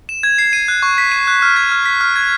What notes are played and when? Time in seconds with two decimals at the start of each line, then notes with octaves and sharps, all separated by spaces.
0.09 E7
0.23 G#6
0.38 C7
0.53 D#7
0.68 F#6
0.83 C#6
0.98 B6
1.12 D#7
1.28 F#6
1.42 F6
1.56 G#6
1.72 F6
1.86 B6
2.01 F6
2.16 G#6